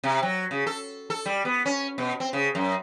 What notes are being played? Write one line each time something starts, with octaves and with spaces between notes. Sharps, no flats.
C3
F#3
C#3
A4
A4
G3
B3
C#4
B2
C4
C#3
F#2